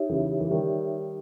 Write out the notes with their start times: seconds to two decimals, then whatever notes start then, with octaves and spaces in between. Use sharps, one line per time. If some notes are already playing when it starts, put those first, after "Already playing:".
Already playing: D#4 G4 C#5 E5
0.09 C#3 E3
0.40 E3
0.50 D#3 G3